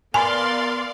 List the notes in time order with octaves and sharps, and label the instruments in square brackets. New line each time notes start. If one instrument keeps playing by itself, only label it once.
[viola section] B3 D5 F5 [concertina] A#4 [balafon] G#5 [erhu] C6